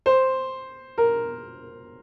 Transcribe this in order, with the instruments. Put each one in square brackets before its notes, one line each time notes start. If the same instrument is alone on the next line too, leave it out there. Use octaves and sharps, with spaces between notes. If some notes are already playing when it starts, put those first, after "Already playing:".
[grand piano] C5
A#4